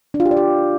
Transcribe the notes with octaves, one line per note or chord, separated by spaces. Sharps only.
D4
F4
G4
D5
G4